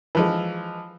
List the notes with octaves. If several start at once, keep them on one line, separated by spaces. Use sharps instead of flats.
E3 F3 G#3